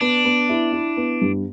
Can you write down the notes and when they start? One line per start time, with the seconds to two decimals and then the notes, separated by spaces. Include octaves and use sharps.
0.01 B3 D4
0.25 B3
0.49 E4
0.73 E4
0.97 B3
1.22 G2